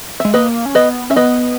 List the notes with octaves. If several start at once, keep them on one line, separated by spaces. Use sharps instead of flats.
G#3 E5
A#3 B4 D#5
C#4
B3 B4 D#5
C#4 E5
B3 B4 D#5